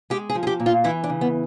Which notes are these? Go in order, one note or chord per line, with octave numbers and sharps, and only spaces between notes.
G#3 G4
G#4
F3
G#4
G4
A#2
F4
E3 E4
D4
C#3
B3